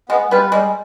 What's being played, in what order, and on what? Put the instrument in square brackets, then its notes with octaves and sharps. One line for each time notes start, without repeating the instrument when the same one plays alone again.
[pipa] G#3 [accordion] B3
[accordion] G3 [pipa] B3 F4 B4
[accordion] G3 [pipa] G#3